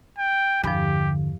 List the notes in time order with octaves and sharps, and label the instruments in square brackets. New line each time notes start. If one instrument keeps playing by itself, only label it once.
[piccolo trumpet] G5
[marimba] E2 G2 F3 [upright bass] D3 [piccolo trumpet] G4